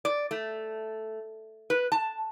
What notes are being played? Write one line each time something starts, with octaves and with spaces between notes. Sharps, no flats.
D5
A3
B4
A5